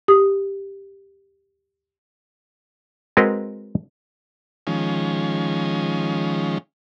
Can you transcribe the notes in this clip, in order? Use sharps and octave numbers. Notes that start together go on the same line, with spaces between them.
G4 D#6
G#3 C4 F#4 A#4 B4 D#5
D#3 F3 G#3 C#4